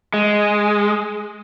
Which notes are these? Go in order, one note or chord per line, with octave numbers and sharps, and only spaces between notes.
G#3